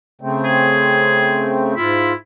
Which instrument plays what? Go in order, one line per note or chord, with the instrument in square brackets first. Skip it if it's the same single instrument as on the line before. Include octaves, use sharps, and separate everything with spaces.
[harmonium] C#3 A3 C4
[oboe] G#4
[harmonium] G#2 F4 [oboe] E4